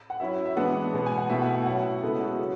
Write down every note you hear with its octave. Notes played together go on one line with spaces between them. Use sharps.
F#5
F#3 C#4 E4 E5
E5
E3 G#3 B3 D4 F#5
B2 G#3 B3
G#5
F#5
B2 A3 E4 E5
F#5
F#5
F#3 C#4 E4 F#5
C#3 G#3 B3 E4 A4
F#4
C#3 F#3 C#4